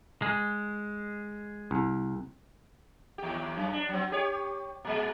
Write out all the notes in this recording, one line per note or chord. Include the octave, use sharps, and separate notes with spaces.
G#3
C2
D#2 G4
F#2
D4
F#3 C4
G4 C#5
A#2 G#3